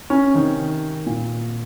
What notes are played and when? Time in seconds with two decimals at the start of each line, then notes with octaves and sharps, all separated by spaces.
0.10 C#4
0.34 C3 D#3
1.06 A#2